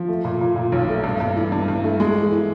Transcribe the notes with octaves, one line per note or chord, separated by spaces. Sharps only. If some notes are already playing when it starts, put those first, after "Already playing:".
Already playing: F3
A3
A#2
A#2
A#2
B1
A3
G2
G2
E3
G2
G2
A3
G#3
E3
E3